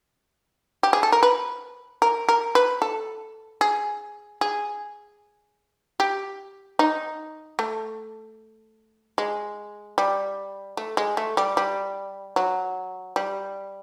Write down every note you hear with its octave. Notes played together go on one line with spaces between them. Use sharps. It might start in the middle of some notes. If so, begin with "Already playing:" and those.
G4
G#4
A4
A#4
B4
A#4
A#4
B4
A4
G#4
G#4
G4
D#4
A3
G#3
G3
A3
G#3
A3
G3
G3
F#3
G3